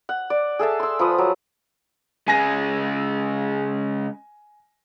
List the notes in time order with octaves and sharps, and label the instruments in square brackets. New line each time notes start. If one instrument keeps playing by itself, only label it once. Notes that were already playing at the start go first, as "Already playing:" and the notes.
[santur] F#5
D5
G#4 A4 E5 A5
C6 E6
F3 B4 D#6
F#3
[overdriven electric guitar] C#3 G#3 [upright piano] G#5 A#6